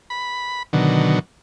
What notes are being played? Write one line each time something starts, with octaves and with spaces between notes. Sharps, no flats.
B5
B2 D3 D#3 F#3